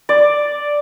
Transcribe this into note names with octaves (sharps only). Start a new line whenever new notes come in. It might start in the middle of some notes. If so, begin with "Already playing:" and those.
D5